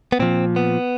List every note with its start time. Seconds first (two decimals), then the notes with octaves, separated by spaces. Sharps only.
0.12 B3
0.19 A#2 F3 C4
0.56 B3